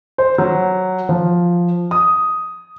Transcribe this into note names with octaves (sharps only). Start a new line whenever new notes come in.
C5
F#3
F3
D#6